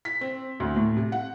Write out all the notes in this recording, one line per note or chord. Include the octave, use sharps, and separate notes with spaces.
B6
C4
D2
A2
C3
F#5